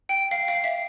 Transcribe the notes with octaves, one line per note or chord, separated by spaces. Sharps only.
G5
F5
F5
E5